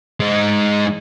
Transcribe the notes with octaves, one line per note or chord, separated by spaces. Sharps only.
G#3 D#4